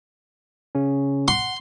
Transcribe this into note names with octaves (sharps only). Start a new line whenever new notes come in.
C#3 C#4
F#5 C6